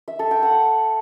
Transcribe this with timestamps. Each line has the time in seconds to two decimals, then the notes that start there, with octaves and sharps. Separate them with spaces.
0.08 E5
0.19 A4
0.31 G5
0.43 F#5